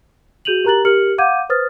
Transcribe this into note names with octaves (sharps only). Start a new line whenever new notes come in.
F#4 G#4 G6 D#7 F7 F#7
G4 A#4 A#5 F#6 A6 F#7
G4 A#4 F6 C#7 F#7
F5 F#5 D6 G6 G#6 D#7
B4 C5 D#6 F6 A6